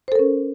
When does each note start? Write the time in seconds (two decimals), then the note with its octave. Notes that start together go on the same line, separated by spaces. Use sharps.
0.08 C5
0.12 A4
0.15 A#4
0.19 C#4